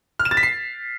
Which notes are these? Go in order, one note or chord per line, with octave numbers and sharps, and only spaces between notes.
F6
E7
A6
B6
C7